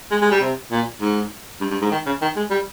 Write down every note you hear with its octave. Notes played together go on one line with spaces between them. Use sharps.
G#3
G#3
G3
C3
A#2
G#2
G2
G2
G#2
D#3
C#3
D#3
G#3
G3